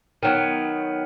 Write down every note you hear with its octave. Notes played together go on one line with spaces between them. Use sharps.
D#3 F#3 B3